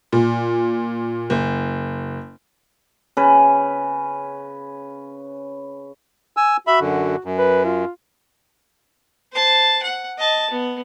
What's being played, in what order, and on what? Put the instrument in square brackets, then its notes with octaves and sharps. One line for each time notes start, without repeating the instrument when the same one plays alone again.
[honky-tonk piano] A#2
F#1
[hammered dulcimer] C#3 B4
[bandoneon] G#5 E6
[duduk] F#4 [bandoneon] E5 B5
[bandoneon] F#2 D3
F#2
[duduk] B4
F4
[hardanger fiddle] C5 A5
F#5
D#5 A5
B3